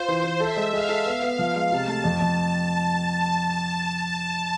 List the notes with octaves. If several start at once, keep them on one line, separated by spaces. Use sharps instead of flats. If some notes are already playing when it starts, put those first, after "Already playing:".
Already playing: F4 C5
E3
E3
A4 E5
G#3
G#3 F5
A4
B3 F5
B3
F3
G#3
C3 A5
A3
F2
F2